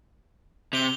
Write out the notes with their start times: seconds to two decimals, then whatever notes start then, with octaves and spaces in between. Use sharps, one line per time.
0.73 C3 F7 G7